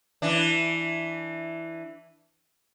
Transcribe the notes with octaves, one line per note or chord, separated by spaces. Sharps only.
E3 D4